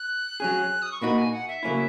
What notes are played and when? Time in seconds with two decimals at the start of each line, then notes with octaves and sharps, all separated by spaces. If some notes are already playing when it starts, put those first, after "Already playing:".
Already playing: F#6
0.40 F#3 C#4 G#4
0.82 D#6
0.92 C#6
1.01 A#2 A#3 D#4 F#4 B5
1.18 G#5
1.32 F#5
1.48 E5
1.63 C#3 F#3 A#3 C#4 E4